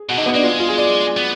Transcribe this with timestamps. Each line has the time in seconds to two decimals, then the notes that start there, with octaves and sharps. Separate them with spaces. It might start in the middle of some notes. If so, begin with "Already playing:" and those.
Already playing: G#4
0.09 B2 F#4
0.18 D3 D#4
0.26 B3
0.35 A#3 D4
0.43 G#3 F4
0.60 F4
0.68 G#4
0.78 D5
1.17 B3